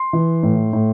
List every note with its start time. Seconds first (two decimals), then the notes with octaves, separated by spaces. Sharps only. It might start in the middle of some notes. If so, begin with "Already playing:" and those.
Already playing: C6
0.13 E3
0.43 A2
0.73 A2